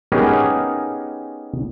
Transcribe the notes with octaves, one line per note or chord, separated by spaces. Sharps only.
B3 C#4 D#4 G4 G#4 A#4